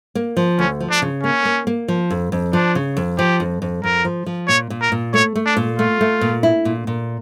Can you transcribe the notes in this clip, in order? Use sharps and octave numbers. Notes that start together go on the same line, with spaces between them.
A#3
F3
D2 C#4
F3
D4
C#3
A#3 C#4
A#3
A#3
F3
F2
F2
F3 D4
C#3
F2
F3 G4
F2
F2
F2 A#4
F3
F3
A#2 C#5
A#2
A#4
A#2
A3 C#5
A3
D4
A#2
A3 F4
A3
A#2
E4
A#2
A#2